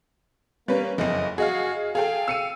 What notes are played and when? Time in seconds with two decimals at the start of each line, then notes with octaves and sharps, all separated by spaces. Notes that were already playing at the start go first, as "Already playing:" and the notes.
0.68 G3 A#3 C#4 B4
0.98 F#1 F2 D#5
1.38 F#4 G#4 D#5 F5
1.95 G#4 A4 F5 G5
2.28 E6 C#7 D#7